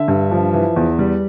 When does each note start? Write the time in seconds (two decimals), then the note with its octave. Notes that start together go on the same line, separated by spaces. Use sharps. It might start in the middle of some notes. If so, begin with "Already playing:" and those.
Already playing: D3 E5
0.08 G2
0.31 F3
0.54 E3
0.76 E2
0.99 G3